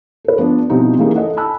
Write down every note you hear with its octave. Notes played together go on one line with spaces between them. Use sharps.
A4 B4
F3 B3 D4
B2 F3 G3 C4 D#4 E4
E3 G#3 A#3 C#4 D#4 G4
A4 D#5 F#5
G#5 A5 B5 E6 F#6